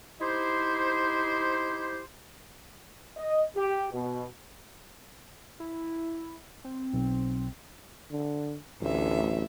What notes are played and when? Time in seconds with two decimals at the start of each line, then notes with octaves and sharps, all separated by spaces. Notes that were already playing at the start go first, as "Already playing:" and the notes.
0.21 D#4 E4 G4 C5
3.17 D#5
3.56 G4
3.93 B2
5.60 E4
6.65 C4
6.94 B1
8.11 D3
8.82 A1 D2 E5